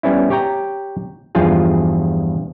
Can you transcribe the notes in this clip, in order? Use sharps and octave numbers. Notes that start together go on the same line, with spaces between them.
G3 B3 C#4 E4
G4 C#5 G5 A#5
E2 G2 F3 F4 G#4